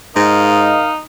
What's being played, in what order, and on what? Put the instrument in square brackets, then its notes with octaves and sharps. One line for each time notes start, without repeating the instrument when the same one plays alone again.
[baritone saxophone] G#2 [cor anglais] D#4 [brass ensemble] A#4 D#5 F5